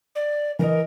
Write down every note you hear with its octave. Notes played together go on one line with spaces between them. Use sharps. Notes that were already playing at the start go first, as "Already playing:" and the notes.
D5
E3 A#4 D#5